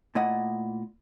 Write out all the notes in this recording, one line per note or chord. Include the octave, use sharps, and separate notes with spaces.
A#2 A3 E4 D5 D#5 F#5